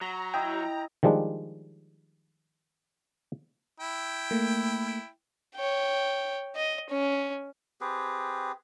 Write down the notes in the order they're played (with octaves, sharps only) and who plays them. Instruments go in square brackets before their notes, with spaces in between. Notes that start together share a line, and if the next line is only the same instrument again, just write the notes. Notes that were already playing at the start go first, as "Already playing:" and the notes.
[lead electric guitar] F#3 [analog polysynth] A#5
[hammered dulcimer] E4 D#5 [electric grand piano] G5
[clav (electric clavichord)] D#3 F3 G3 G#3 D4
[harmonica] E4 G5
[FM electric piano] A3 A#3
[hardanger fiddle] C#5 G5
D#5
C#4
[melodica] C4 G4 G#4 B4